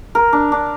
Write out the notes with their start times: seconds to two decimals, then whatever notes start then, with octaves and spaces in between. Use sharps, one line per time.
0.15 A#4
0.33 D4
0.52 D4